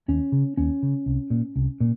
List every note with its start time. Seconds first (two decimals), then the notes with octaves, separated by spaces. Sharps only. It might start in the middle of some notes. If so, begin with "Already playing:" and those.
0.08 D#2 C#4
0.32 C#3
0.57 D#2 C#4
0.82 C#3
1.06 C2
1.30 A#2
1.56 C2
1.80 A#2